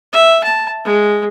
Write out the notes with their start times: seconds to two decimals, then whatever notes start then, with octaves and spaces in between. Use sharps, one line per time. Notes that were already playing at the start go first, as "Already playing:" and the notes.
0.13 E5
0.44 A5
0.85 G#3